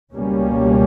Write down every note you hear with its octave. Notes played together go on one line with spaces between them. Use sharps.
C#2 B2 G3 A#3 C#4